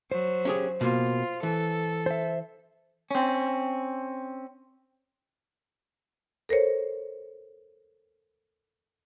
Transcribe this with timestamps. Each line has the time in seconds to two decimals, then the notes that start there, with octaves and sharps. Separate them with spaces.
0.12 F#3 C5
0.45 C#4 G4 G#4
0.81 B2 A#3 F4
1.43 E3 A4
2.06 C5 E5
3.11 C4 C#4
6.49 A4 A#4 C5 C#5